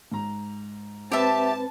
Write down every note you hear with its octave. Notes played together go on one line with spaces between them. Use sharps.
G#2 A#5
C4 G4 B4 E5 A5